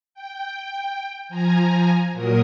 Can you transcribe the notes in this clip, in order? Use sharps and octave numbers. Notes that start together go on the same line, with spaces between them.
G5
F3 G#5 A#5
A#2 F#3 A#4 D#6